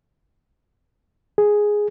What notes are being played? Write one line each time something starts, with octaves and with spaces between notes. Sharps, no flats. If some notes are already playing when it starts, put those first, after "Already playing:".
G#4